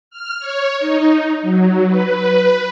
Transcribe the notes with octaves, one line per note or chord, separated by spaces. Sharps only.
F6
C#5
D#4
F#3
B4